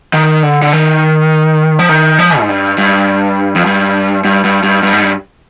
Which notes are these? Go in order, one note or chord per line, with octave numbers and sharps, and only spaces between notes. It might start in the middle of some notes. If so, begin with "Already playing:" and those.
D#3
D3
D3
D#3
F3
D#3
F3
G#2
G2
G2
F2
G2
G2
G2
G2
G2
G#2
G2